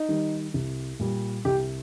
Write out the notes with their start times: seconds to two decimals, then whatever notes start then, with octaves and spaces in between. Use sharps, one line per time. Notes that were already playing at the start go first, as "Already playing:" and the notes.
Already playing: D#4
0.08 D#3 G3
0.54 C2
1.00 A#2 G3
1.45 C2 G4